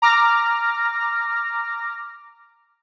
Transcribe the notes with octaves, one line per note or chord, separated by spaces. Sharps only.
A#5 D6 F6 A#6